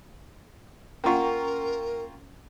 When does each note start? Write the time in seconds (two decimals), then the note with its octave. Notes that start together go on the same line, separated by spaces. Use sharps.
1.04 A#3 C#4 F4 A#4 F#5 G5 A#5 C#6